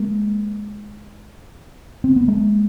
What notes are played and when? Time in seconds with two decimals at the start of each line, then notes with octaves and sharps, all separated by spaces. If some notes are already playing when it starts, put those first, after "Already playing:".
Already playing: G#3 A#3
2.04 C4
2.16 B3
2.28 G#3 A#3